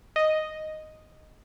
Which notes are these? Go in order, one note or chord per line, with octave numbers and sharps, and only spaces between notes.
D#5